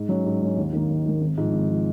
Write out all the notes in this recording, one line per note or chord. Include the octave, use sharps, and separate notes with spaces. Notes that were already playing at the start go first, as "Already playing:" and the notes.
Already playing: G#2
F#3 C#4
G#2
F#3 C#4
D#2
D#3 A#3
D#2
D#3 A#3
G#1
G#2 F3
G#1
F3